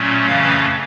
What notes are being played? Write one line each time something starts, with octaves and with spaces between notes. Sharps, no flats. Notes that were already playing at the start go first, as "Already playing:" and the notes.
Already playing: A#2 F#3 A3 C#4
F2 C#3 E3 A3 C#4 F5